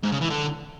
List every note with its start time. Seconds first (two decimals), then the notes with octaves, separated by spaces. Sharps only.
0.03 G#2
0.12 C#3
0.21 E3
0.30 D3